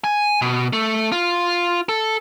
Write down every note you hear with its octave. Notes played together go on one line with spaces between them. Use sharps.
G#5
B2
A3
F4
A4